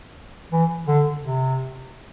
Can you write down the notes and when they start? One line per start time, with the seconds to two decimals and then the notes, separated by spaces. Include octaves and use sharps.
0.52 E3
0.87 D3
1.23 C3